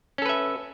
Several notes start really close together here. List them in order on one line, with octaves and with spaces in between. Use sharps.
C#4 A4 B4 E5